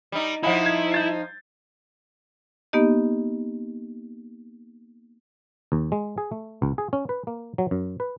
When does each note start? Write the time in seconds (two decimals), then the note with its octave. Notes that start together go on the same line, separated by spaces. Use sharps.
0.12 G3 D#4
0.43 F3 D#4 E4 D#5 F#5 B5
0.66 G#6
0.92 G6 A6 C7
2.73 A#3 B3 D#4 G4 D#5
5.72 D#2
5.92 G#3
6.18 G#4
6.32 A3
6.62 C#2
6.78 G#4
6.93 C#4
7.09 B4
7.27 A#3
7.58 F#3
7.71 F#2
8.00 B4